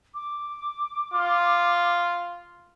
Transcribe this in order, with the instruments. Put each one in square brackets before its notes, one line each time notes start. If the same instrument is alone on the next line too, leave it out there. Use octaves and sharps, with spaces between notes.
[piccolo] D6
[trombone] F4